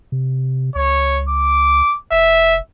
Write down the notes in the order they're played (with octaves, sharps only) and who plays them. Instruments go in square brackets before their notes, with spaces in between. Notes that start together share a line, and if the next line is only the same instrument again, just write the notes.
[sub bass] C3
[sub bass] C#2 [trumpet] C#5
[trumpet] D6
[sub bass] F1 [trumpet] E5